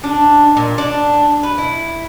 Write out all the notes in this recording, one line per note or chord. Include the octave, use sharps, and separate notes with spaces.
D4
A#2
D4
B4
E4